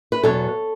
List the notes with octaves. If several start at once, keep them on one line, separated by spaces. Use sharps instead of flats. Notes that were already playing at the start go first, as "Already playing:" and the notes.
B4
E2 B2 F#3 A4 C#5